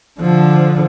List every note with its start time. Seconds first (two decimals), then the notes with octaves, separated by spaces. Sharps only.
0.20 D3 F3